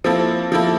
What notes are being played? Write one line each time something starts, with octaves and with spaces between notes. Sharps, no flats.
F3 A#3 C4 E4 A4
F3 A#3 E4 A4